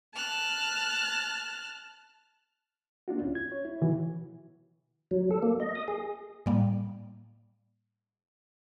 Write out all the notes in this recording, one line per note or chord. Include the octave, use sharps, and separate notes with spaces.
A5 F6 F#6
A#3 D4 F4 F#4
C#2 C#4 E4
G#6
C#5
E4
B2 D#3 E3 F#4
F#3
A4
A#3
D#5
D#6
G#4
A2 G3 A#3